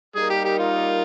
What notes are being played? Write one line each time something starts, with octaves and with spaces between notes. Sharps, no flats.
G3 A#3 D#4 G#4 A#4
G4
G4
F4